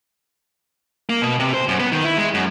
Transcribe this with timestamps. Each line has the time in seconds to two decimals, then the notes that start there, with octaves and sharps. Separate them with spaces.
1.10 A#3
1.22 B2
1.39 C3
1.54 C5
1.68 F#2
1.80 B3
1.92 D#3
2.05 E4
2.18 G#3
2.34 F#2